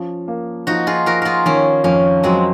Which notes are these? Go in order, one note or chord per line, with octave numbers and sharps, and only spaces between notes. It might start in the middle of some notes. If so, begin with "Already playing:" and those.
Already playing: F3 C#4
A#3
F3 D#4 F#4
F4 G#4
F3 F#4 A#4
F4 G#4 A#4
D#3 A#3 C#4
F2 A#3 C#4
F#3 G#3 C4